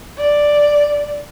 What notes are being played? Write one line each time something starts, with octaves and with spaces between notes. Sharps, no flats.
D5